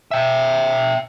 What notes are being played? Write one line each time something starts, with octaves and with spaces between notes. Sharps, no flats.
E5 G5